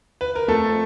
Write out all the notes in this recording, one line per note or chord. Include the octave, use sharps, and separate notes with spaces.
B4
A#4
F2 A3 A4